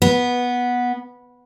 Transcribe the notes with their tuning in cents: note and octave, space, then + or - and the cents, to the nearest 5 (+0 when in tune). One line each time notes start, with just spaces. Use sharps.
B3 -10